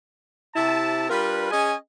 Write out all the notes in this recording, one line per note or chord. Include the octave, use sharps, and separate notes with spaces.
C3 E4 A5
G3 D4 F4 A#4 B4
C#4 G#4 D#5 G#5